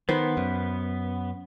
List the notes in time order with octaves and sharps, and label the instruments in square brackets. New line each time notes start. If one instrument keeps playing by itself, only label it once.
[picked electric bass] D#3 [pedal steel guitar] B3 [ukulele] B4 C5
[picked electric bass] F#2